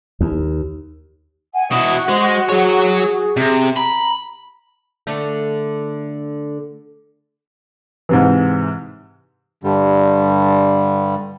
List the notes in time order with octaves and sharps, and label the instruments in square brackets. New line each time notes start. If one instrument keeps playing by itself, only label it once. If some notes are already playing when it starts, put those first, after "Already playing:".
[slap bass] D#2
[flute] F#5 [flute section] G#5
[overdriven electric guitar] B2 E4 [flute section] F#4 [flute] D#6
[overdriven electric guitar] G#3 [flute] C5
[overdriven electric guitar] F#3 C#5 [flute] G#4
[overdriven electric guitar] C3
[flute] A#5 [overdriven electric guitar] B5
[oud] D3 A3
[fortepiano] G#2 C3 E3
[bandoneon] G2 D3 G3